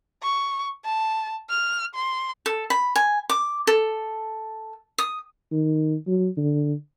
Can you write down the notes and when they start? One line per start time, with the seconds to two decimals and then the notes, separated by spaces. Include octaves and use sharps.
0.23 C#6
0.85 A5
1.49 F6
1.95 C6
2.46 A4
2.70 B5
2.96 G#5
3.30 D6
3.67 A4
4.98 D#6
5.52 D#3
6.07 F#3
6.37 D3